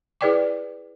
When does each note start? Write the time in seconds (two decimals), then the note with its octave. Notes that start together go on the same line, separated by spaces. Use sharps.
0.21 E4 G#4 B4 D5 G5 D6